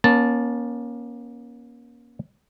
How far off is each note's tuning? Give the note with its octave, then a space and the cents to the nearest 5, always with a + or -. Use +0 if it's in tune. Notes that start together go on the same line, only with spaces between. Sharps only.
A#3 +35 C#4 +0 A5 +0